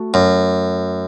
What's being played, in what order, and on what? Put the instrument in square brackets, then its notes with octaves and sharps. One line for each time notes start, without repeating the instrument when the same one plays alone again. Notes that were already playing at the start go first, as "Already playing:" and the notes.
Already playing: [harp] A3 F#4 A4
[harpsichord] F#2